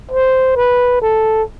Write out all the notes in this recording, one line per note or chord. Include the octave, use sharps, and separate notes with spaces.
C5
B4
A4